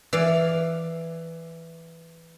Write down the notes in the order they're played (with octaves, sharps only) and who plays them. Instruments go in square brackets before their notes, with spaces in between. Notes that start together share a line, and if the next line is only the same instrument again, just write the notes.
[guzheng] E3 D5 F5